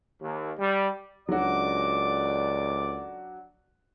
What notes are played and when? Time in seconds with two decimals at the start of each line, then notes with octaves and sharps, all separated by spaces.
0.20 D#2
0.58 G3
1.29 C#2 F#2 F#3 D4 F#4 A4 D5 D6